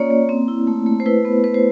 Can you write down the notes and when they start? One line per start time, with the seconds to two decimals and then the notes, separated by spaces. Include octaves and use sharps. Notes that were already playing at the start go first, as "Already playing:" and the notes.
Already playing: A#3 C#4 F4 C#5 D5
0.11 A#3
0.29 C4
0.48 E4
0.67 A3
0.87 A3
1.00 C5
1.06 E4 B4
1.25 B3
1.44 B3 B4
1.54 C5